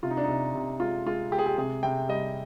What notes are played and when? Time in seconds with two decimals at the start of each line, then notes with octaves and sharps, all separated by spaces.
0.03 C3 F4
0.10 D#4
0.17 D4
0.24 C3 D#4
0.55 C3
0.80 G#3 F4
1.06 G#3 F4
1.31 G#3 G4
1.39 G#4
1.46 G4
1.58 C3 G#4
1.83 C3 G5
2.09 G3 D#5